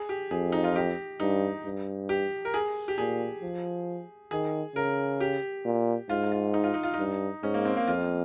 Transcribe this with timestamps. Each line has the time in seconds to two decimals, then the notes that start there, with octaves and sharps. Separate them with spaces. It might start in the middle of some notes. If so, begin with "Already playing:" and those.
Already playing: G#4
0.09 G4
0.31 F2 G#4
0.52 D#4
0.64 F4
0.76 G4
1.20 G2 D#4
1.65 G2
2.09 G4
2.45 A#4
2.54 G#4
2.88 G4
2.98 A#2 G#4
3.42 F3
4.31 D#3 G#4
4.75 C#3 A#4
5.20 G4
5.65 A#2
6.09 G#2 F4
6.32 F4
6.54 D#4
6.64 F4
6.74 D#4
6.83 F4
6.94 G2 D#4
7.43 G#2 C#4
7.54 A#3
7.65 C4
7.77 A#3
7.87 F2 F4